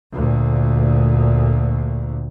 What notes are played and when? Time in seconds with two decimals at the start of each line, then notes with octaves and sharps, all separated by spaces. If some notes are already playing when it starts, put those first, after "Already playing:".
0.13 D2 A#2